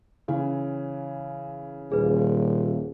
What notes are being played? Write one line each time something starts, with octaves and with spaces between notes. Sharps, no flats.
C#3 E3
D#1 G#4 B4